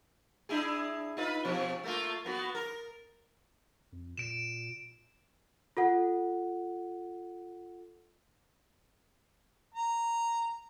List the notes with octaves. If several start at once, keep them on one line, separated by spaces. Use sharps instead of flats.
D4 E4 G#4
D#4 F4 B4
B2 F3 C#4
A3 A#3 F4
A#3 B3 F#4
A#4
F2
A#2 D7 E7
F4 A4 F#5
A#5